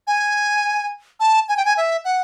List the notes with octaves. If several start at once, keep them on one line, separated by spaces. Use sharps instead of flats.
G#5
A5
G#5
G5
G#5
E5
F#5